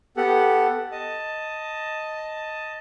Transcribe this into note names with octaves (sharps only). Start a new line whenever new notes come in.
B3 G4 A4 F#5
D#5 A5